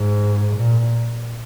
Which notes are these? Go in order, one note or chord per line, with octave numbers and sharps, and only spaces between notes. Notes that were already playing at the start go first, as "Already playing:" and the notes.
Already playing: G#2
A#2